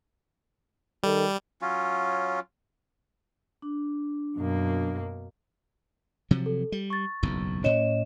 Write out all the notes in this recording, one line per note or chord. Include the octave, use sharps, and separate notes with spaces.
D#3 G3 A4
F#3 C#4 F4
D4
F#2 B2 A#3
C3 F3 F#3
A4
G3
C#6 A6
F#1 B1 E2
A2 C#4 C#5 D#5 E7